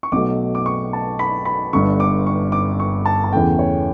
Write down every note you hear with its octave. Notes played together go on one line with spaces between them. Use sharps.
C#6
B1 B2 F#3 A3 D6
D6
C#6
A5
B5
B5
G1 G2 D3 C#6
D6
C#6
D6
C#6
A5
A5
E2 C#3 E3 A3 G5
C#5